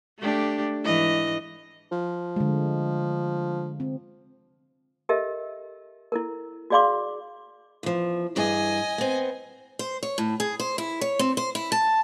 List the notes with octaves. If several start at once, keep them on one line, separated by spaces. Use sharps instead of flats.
A3 D4 G4
G#2 E3 D#5
F3
D3 G#3
C4
G4 A4 A#4 D#5 E5
E4 A4 A#4
F#4 G#4 D5 F5 C6 D6
E2 F3
G2 E3 G#4 D#5 G#5
B3 C4
C5
C#5
A2
G#4
C5
E4
C#5
C4
C5
E4
A5